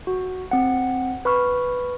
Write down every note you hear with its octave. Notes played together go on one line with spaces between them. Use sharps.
F#4
C4 F#5
B4 B5 C#6 F6